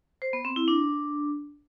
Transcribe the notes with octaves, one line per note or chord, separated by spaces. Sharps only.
C5
B3
C4
E4
D4